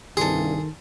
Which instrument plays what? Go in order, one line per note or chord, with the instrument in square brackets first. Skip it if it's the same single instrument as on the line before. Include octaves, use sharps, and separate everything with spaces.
[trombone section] C2 G2 [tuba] D#3 [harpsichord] G#4 [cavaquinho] A4 C6